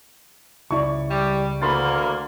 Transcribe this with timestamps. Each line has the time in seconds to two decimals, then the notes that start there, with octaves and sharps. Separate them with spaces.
0.71 C#2 E4 D5 C#6
1.10 G3
1.62 D2 E3 A#3 B5 C6 A6